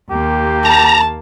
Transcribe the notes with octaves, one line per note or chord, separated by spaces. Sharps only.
D#2 A#3 G4
A5 A#5